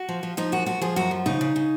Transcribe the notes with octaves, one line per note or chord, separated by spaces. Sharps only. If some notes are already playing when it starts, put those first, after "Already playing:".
Already playing: F#4
F3
F3
F3 D#4
F#2 F#4
F3 F#4
F3 G#4
F#2 F#4
F3
C#3 D#4
C#3
C#3